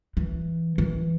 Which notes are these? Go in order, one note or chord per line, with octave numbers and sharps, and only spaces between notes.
E3
E3